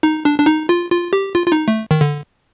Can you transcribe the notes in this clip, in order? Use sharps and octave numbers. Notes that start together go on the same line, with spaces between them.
D#4
D4
D4
D#4
F4
F4
G4
F4
F4
D#4
A3
D#3
D3